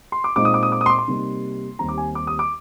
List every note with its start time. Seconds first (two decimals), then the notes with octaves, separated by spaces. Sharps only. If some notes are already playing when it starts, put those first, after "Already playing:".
0.12 C6
0.24 D6
0.36 A#2 G#3 C4 D#4 D6
0.45 D#6
0.54 D6
0.63 D#6
0.72 D6
0.81 D#6
0.86 C6
0.90 D6
0.98 C6
1.08 C3 G3 A#3 D#4
1.79 D#2 D#3 G3 C4 A#5
1.89 D6
1.98 G#5
2.15 D6
2.27 D#6
2.39 D6